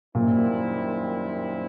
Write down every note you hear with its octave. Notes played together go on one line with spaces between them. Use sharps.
F#2 A#2 D#3 G3 C4 E4